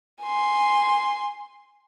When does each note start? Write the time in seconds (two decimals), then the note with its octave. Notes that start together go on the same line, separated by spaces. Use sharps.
0.23 G#5 C6